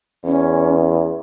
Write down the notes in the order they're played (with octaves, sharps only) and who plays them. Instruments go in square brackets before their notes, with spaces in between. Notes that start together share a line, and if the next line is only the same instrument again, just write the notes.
[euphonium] E2 [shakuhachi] C#4